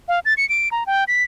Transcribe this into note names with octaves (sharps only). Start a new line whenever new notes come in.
F5
A6
C#7
D7
A#5
G5
B6